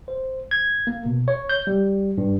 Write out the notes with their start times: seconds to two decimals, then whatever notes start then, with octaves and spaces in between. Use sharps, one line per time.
0.08 C5
0.51 G#6
0.87 A#3
1.06 B2
1.28 C#5
1.49 G6
1.67 G3
2.18 G2